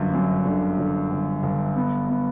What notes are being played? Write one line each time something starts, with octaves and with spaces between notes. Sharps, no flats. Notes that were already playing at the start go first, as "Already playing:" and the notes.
Already playing: G1 F#2 D3
F#2
D3
D3
G1
G1
B3
B3